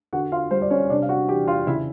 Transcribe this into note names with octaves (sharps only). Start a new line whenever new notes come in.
D3 F#4 F#5
F4 F5
G3 C5
D5
C#4 C#5
C3 D4 D5
F5
F#4 F#5
E3 G4 G5
F4 F5
C#3 E4 E5